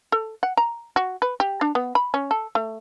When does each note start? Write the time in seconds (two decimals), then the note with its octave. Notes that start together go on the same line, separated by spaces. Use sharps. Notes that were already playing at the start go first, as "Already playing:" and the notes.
0.12 A4
0.43 F#5
0.57 A#5
0.96 F#4
1.22 B4
1.40 G4
1.61 D4
1.75 B3
1.95 B5
2.14 C#4
2.31 A4
2.55 A3